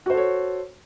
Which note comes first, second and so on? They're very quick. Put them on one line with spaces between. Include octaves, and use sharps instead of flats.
F#4 C5 A4 C#5